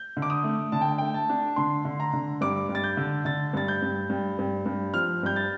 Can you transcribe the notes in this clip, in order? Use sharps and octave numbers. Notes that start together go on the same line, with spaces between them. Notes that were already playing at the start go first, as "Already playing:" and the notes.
Already playing: G6
D3
D6
D#6
A3
D3 A5
G5
A3 G5
A5
D4
D3 C6
D3
A#5
D3
G2 D6
G2
A6
G6
D3
D3 A6
G2 A6
G6
G2
G2
G2
G2
F3 F6
G2 G6
A6